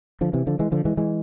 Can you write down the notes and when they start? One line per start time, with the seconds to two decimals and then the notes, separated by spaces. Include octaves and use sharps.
0.21 D3 F3
0.33 C3 E3
0.47 D3 F3
0.59 E3 G#3
0.72 D3 F3
0.85 E3 G#3
0.97 E3 G#3